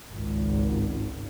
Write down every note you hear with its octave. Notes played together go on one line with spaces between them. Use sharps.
G#1 C#2